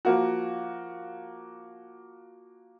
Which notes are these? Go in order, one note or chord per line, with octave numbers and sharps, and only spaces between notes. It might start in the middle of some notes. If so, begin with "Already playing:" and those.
F3 A#3 F#4